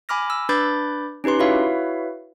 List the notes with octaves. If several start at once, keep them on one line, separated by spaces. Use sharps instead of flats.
G#5 B5 D6 F6 A#6
E6
D4 B4 B5 D6 G6 A6
C#4 D#4 G4 B4 C6
E4 F#4 B4 C#5 E5 F5